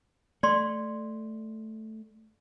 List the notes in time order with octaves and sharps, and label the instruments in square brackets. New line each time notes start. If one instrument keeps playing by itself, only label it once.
[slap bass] A3 [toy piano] D5 C6